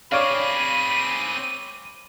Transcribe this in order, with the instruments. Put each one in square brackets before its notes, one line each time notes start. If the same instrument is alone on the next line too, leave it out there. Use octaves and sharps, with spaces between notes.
[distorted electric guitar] C4 G#4 [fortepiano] C#5 D5 F5 [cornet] B5 [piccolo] D#7